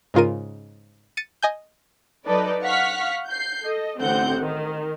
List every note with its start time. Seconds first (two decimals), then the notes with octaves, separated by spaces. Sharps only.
0.14 G#2 C#3 F4 A#4 D#7
1.17 A6 C#7 D#7
1.42 D#5 G#5 G6
2.26 F#3 D#4 A4 B4 D5
2.63 F5 F#5 C#6 F6 B6
3.29 G6 C7
3.65 A4 D#5
4.00 A1 D3 C4 F#5 G6
4.40 D#3